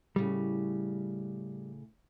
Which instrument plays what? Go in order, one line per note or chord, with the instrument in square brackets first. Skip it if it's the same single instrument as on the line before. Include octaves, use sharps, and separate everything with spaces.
[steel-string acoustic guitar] A2 C#3 [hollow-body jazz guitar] G3